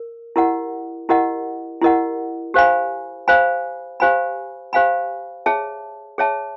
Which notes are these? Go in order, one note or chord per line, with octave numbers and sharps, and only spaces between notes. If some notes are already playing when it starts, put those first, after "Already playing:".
Already playing: A#4
E4 G4 A#4 D#5 F#5
E4 G4 A#4 D#5 F#5
E4 G4 A#4 D#5 F#5
G4 C5 F5 G#5 B5
G4 C5 F5 G#5 B5
G4 C5 F5 G#5 B5
G4 C5 F5 G#5 B5
G#4 C#5 E5 A5
G#4 C#5 E5 A5